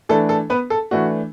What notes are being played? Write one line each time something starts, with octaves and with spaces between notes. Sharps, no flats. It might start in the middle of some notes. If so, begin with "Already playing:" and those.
E3 A3 D4 A4
A4
B3 B4
A4
E3 A3 D4 F#4